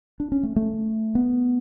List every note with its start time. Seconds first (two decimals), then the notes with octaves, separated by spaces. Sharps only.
0.20 D4
0.32 C#4
0.43 A3
0.56 A3
1.15 B3